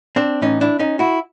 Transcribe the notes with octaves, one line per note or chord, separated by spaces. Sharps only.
C4 D4
A2 E3 C#4 D#4
D4 E4
C#4 D#4
E4 F#4